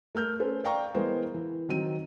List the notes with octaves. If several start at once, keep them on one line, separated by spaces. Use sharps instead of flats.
A3 A#4 F6 G6
C#4 A4 B4 C5
D5 F5 G5 A#5 C#6
E3 G#3 B3 G#4 A#4 C5
E3
D#3 F#3 C4 D#7